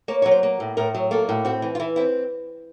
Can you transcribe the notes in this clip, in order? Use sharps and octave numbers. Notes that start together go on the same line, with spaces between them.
A#3 C#5
F#3 C#5
C5
A#3
A2
A2 A#4
F#3
A#3 A4
A2
C4 F#4
E3
F4
E3 E4
C4 E4